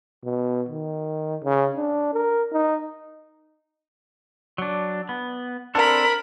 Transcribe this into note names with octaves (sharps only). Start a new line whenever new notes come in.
B2
D#3
C#3
D4
A#4
D#4
F#3 D4
B3
C4 D4 A4 A#4 B5